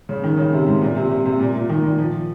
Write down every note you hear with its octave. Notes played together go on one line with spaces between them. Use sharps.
C#3
D#3
C#3
C3
G#2
A#2
C3
C3
C3
A#2
A#2
D#3
A#2
F3